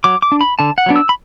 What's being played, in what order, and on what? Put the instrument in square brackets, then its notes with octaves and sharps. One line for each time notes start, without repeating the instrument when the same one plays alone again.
[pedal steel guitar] F#3 D6
D6
D4
B5
D3 A5
F#5
F#3 B3 D4
E6
B5